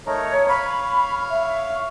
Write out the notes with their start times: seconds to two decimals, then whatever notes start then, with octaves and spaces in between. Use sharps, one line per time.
0.06 A3 D#4 A#4 C#5
0.48 C#5 F5 B5
1.30 E5